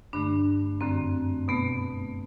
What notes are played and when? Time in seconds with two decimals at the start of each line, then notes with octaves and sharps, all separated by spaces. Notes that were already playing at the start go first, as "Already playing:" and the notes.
0.13 G2 D3 A3 D4
0.81 F#2 D3 A3 C4
1.48 B2 A3 B3